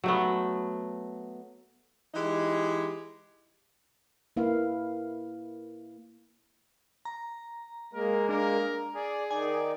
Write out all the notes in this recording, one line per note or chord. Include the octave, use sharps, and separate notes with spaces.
F#3 A3 B3
E3 G#3 D#4 G4
A#3 E4 B4 F5
A#5
G#3 A#3 A#4
D4 A#4
G#4 D5
D#3 D#4 D5 G#5